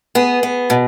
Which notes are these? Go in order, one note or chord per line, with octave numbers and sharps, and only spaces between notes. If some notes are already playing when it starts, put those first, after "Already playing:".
B3 G#4
B3
B2